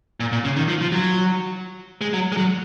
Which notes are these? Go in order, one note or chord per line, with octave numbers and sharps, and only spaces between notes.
A#2
A#2
C#3
D#3
F3
F3
F#3
G#3
F#3
G#3
F#3